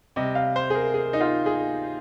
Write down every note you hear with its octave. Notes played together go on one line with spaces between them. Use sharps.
C3 G3 D#5
F5
C5
G#4
A#4
G#4
D#4
F4
G#4